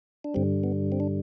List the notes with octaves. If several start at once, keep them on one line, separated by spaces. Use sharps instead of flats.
D4
G2 D3 G3 C4
B3
C4
D4